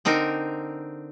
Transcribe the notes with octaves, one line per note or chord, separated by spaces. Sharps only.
D3 C4 D#4 A#4